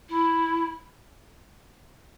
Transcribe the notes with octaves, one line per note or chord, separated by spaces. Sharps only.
E4